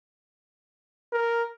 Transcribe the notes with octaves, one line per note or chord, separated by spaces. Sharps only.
A#4